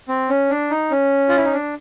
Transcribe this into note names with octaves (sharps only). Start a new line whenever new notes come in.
C4
C#4
D4
D#4
C#4
F4
E4
D#4
D4